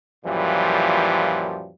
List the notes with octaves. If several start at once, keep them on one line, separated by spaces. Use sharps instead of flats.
F#2 A#2 E3 F3 G3